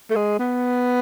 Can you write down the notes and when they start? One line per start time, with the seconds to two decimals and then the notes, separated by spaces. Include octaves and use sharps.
0.10 A3
0.16 G#3
0.39 B3